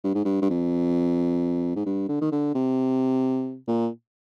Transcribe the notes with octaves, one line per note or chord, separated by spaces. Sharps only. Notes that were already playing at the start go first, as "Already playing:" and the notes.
G2
G#2
G2
G2
F2
G#2
G2
D3
D#3
D3
C3
A#2